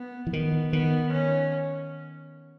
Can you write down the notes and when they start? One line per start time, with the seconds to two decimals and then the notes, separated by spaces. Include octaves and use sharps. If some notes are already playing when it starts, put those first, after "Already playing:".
Already playing: B3
0.27 E3
0.33 D#3 B3
0.73 D#3 B3
1.12 C#4